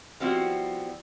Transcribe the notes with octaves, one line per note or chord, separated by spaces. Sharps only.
F3 G3 B3 C4 E4 F#4